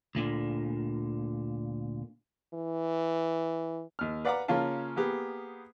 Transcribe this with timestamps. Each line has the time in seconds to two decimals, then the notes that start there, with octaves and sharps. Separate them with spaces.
0.15 D2 A#2 D3
2.54 E3
3.99 D#2 F6
4.25 B4 D5 F5 F#5 A#5 D6
4.48 C#3 A#3 C#4 F4 F5 A5
4.96 A#3 B3 G4 G#4